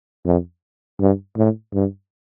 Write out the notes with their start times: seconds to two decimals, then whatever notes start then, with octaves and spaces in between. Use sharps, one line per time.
0.25 F2
1.00 G2
1.37 A2
1.73 G2